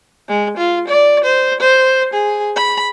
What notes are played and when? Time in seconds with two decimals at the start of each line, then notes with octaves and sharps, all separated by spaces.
0.28 G#3
0.57 F4
0.88 D5
1.24 C5
1.61 C5
2.14 G#4
2.57 B5